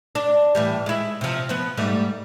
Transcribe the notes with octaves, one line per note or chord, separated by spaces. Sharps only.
D4
A2 E3 G3
G#3 E4
C3 F3
F3 B3
G#2 G3 A3